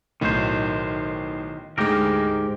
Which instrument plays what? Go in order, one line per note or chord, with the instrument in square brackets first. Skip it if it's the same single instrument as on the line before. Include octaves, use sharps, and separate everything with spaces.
[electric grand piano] B1 A2 [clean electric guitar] D#3 C5
[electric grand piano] D2 G#3 [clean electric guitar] G#2 G4 A#4